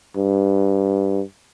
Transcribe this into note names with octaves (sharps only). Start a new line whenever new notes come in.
G2